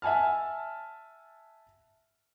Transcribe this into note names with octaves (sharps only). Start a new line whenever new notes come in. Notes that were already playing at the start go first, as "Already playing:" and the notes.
E5 F#5 G#5 A5 F6